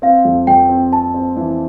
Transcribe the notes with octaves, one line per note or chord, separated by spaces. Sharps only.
C4 F5
F2
F2 G5
C4
C4 A5
C4
E3